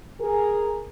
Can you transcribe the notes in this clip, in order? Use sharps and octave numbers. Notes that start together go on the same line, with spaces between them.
G#4 A#4